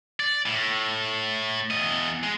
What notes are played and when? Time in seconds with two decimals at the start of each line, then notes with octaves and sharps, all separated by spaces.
0.20 D5
0.46 A2
1.71 E2 D#5
2.23 G#3